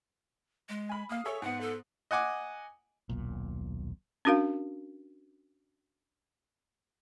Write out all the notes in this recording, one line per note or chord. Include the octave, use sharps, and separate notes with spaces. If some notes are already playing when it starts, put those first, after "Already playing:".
G#3
G#5 B5
A#3 F5 D#6
G#4 A4 C#5 E5
G#2 B3 F#5
A4
D#5 F#5 G#5 D6
D#1 B1 A#2
C#4 D4 F#4 A#4 F5